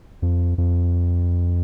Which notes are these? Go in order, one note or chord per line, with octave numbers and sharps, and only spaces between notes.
F2
F2